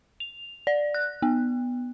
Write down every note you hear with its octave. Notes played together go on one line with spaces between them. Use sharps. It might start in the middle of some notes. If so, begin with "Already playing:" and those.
F7
D5
F#6
B3